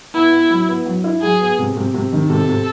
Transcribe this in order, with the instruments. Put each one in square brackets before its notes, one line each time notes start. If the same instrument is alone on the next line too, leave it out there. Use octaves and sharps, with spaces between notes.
[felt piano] B3 [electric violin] E4
[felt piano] B3
F#3
B3
F#3
E4
[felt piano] F#3 [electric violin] G#4
[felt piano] B3
C3
C3
C3
D#3
[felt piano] C3 [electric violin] A4
[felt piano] C3